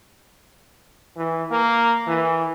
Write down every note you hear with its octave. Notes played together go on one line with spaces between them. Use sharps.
E3
A#3
E3